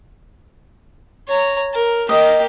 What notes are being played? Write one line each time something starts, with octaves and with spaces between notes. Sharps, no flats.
C#5 A#5
A#4
A#3 G4 D#5